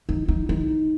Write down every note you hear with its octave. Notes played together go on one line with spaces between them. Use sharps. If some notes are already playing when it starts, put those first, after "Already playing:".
D#4
D#4
D#4